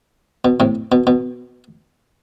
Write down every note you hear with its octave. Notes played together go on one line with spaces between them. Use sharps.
B2
A2 C3
B2
B2